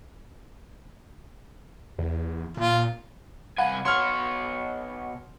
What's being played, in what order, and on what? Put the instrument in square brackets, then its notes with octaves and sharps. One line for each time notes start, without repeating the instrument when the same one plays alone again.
[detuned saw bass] E2
[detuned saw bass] A#2 [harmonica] F4
[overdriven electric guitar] C2 G#5 [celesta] F5 B5 [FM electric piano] F#5
[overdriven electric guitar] B2 C#5 [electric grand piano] C6 F6